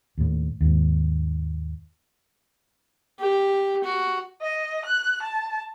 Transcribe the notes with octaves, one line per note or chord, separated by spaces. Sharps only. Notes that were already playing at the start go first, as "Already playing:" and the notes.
D#2 A2
D#2 G#2
G4
F#4
D#5
F#6
A5